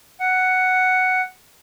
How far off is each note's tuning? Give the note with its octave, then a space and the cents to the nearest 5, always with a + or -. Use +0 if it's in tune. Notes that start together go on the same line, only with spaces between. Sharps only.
F#5 +5